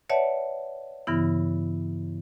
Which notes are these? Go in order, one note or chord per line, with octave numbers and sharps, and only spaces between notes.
B4 C#5 D5 E5 F#5 A5
G2 C#3 E3 B3 E4